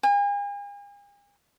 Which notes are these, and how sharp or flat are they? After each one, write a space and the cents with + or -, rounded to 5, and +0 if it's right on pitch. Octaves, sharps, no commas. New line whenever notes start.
G#5 -40